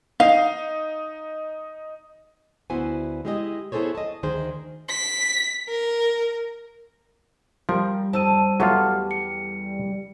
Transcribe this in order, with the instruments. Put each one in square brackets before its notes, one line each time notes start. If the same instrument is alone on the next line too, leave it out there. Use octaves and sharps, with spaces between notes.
[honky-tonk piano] D#4 [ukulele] F5
[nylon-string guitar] D2 B3 E4 F#4 C5 G#5
G#3 E4 G4 G#4 C#5 D#5
B3 E4 G#4 A4 C5 C#5
D#5 A5
D2 D#3 G#4 C5
[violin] B6
A#4
[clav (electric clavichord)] F3 [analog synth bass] G3 [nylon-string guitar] A#4
[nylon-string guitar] F2 D#4 A5 [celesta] C5 E6 D#7
[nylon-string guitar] E2 A4 [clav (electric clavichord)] F#3 A3 F4 [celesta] F#5 D6 F6
[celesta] C#7